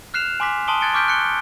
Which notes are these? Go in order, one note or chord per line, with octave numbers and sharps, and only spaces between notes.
F6 F#6 C7 E7 F7
G#5 C6 D6 F#6 B6
A5 C6 D#6 D7 G7
F#6 G#6 A6 C#7 D7 G7
C#6 D6 F6 G6 B6 D7
F#6 C#7 G7